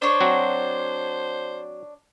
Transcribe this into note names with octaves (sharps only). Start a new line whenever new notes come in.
D4 C5 C#5
F#3 C4 F#4